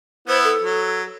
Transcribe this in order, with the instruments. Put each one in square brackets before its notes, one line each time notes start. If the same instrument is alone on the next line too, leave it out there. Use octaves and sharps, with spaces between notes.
[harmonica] B3 E4 [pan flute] C5
[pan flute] A4
[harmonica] F#3